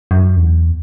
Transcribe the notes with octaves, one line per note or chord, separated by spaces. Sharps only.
F#2
E2